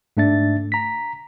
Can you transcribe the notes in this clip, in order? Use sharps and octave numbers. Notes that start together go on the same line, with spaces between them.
G#2 A3 D4 E5 A6
A#5 B6